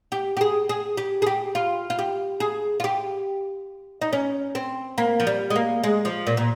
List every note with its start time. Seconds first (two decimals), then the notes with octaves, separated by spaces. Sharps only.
0.12 G4
0.37 G4
0.41 G#4
0.69 G#4
0.97 G4
1.22 G#4
1.27 G4
1.55 F4
1.90 F4
1.99 G4
2.40 G#4
2.80 F4
2.84 G4
4.02 D#4
4.13 C#4
4.55 C4
4.98 A#3
5.20 F3
5.27 G3
5.50 G#3
5.56 A#3
5.84 G#3
6.05 F3
6.27 A#2
6.37 A#2